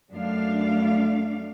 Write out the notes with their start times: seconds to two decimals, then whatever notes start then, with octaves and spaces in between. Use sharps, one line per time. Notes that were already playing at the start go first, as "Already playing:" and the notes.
0.11 F#2 A3 D4 F5